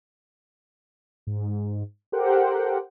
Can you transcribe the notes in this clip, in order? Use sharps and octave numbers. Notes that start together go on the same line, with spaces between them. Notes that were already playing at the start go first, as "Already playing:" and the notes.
G#2
G4 A4 A#4 C5 F#5 G5